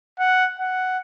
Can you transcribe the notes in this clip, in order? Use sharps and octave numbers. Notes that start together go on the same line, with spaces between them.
F#5
F#5